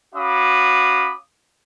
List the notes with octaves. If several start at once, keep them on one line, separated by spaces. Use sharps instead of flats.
C#4 F#4 F5 B5 D6 D#6